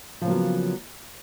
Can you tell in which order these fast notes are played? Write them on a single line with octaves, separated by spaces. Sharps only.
F3 C#3 A#3 F#3 B3